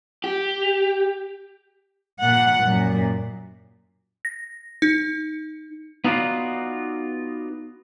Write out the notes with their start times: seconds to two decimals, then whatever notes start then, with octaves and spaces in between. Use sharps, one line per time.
0.24 G4
2.20 A#2 F#5
2.63 F#2 A#2
4.25 A#6
4.82 D#4
6.04 B3 D#4 F4 F#4 D5 F5